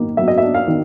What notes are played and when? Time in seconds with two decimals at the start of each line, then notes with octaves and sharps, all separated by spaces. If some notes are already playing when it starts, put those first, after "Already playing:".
Already playing: D#3 A#3
0.17 F#3 E5
0.28 D#5
0.38 E5
0.42 D4
0.54 F5
0.67 D#3